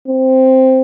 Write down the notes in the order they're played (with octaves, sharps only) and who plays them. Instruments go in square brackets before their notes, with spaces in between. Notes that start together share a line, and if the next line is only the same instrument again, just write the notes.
[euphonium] C4